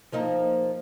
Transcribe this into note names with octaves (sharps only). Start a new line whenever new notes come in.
F3 A#3 D#4